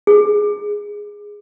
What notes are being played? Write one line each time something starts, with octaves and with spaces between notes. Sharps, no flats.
G#4